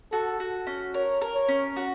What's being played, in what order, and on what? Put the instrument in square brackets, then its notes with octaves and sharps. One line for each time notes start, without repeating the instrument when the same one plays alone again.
[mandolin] F#4 [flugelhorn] A4
[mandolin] F#4
C#4
[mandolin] A#4 [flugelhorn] C#5
[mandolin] A#4
[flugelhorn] C#5
[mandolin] C#4
F#4